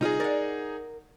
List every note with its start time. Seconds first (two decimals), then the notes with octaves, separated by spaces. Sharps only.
0.01 C2 D#4 F4 G#4 D#5
0.20 A#4 D5 F#5